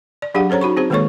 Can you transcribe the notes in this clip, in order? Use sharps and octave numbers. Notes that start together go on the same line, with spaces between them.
D5
F#3 D4 G4 G#4 F5 F#5
C#4 A4 C5 C#5 A#5
D#4 F#4 B5 C#6
C4 G#4 C5
D#3 G#3 A#3 A4 C#5 C#6